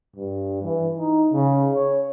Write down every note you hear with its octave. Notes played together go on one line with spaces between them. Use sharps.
G2
E3
D#4
C#3
C#5